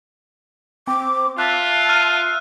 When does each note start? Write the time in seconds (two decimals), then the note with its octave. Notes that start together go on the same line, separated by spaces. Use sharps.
0.87 C4 D6
1.38 F4 E5 A5 F#6
1.89 F6 D#7